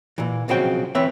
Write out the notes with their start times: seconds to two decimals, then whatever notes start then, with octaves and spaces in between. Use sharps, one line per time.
0.18 A#2 E3
0.48 B1 C#3 F3 C4 F#4 G5
0.95 D2 E3 C4 B4 C#5 E5